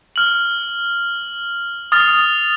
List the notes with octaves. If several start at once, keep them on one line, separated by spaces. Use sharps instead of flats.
F6 F#7
D#6 F6 A6